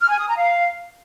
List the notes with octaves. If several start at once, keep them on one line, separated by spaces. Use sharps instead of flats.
F6
G#5
D#6
A#5
F5